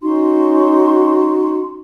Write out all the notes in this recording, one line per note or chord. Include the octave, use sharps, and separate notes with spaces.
C#4 D#4 F#4 C6